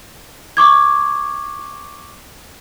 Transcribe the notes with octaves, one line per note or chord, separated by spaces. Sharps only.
C#6 D6 G#6